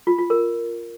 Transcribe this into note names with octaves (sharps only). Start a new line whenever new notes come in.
F4
F4
A#4